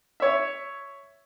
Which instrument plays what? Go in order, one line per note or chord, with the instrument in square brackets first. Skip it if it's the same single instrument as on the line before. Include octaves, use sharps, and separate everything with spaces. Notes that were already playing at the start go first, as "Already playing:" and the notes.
[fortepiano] C#5 E5